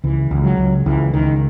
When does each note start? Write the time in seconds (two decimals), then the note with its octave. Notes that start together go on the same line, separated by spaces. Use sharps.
0.04 C#2 E3
0.31 C#2
0.44 F#3
0.58 C#2
0.86 C#2 E3
1.14 C#2 D#3